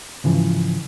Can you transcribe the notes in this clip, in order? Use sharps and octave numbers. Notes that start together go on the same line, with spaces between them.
G#2 C#3 E3 F3